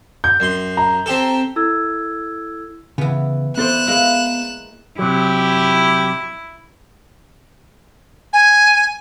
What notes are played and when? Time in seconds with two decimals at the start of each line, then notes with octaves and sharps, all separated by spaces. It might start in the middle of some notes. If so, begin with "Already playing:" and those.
0.24 G6
0.40 F#2 C6
0.77 A#5
1.06 C4 G4 A4
1.56 E4 A4 E6 G#6
2.98 C#3 E3 B3
3.58 B3 E4 A4 C5 D5 F#6 E7
3.87 G#3 A#3 E4
4.99 C3 F#3 E4 G4
8.33 G#5